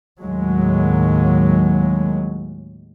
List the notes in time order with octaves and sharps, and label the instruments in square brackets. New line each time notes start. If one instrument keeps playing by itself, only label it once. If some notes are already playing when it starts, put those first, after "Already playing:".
[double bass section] D#2 A2 F#3 G#3